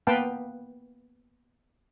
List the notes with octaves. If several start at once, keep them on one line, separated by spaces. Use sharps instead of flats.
A#3 B3 B4 F5 G5 A5